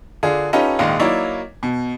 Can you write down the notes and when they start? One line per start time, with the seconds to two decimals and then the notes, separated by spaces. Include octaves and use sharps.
0.23 D3 D4 F4 G#4
0.53 C#4 D#4 F4 G4 A4 B4
0.79 A#1 G#2 D#3 D#4 F5
0.99 F#3 A#3 D#4 E4 C#5 D5
1.63 B2